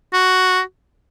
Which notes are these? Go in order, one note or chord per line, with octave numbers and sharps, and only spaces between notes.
F#4